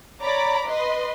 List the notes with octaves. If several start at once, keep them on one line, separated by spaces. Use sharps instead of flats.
C#5 D5 A#5 B5 D6
B4 D#5 C6